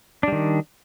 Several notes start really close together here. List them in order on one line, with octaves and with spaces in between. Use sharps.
D4 G3 D#3